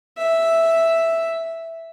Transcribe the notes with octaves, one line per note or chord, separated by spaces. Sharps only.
E5